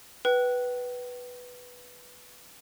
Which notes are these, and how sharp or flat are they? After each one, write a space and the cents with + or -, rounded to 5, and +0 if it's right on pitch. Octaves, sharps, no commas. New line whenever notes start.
B4 +0 G5 -35